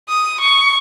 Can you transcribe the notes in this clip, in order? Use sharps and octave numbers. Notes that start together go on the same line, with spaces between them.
D#6
C#6